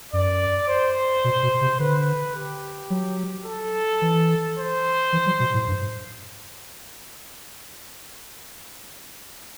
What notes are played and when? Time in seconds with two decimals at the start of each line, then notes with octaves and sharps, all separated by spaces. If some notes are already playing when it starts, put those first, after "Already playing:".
0.13 F#2 D5
0.68 C5
1.24 B2
1.43 B2
1.61 C3
1.79 D3 B4
2.35 G4
2.90 F#3
3.46 A4
4.02 E3
4.57 C5
5.13 E3
5.26 F#3
5.40 B2
5.54 A2
5.68 G2